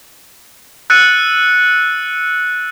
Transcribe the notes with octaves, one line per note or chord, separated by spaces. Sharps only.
E6 F#6 A6 C#7 D#7